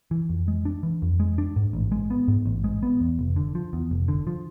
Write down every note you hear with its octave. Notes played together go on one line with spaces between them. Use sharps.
E3
F2
G#3
D4
E3
F2
G#3
D4
G#2
A1
G#3
B3
G#2
A1
G#3
B3
E2
F1
D3
F3
E2
F1
D3
F3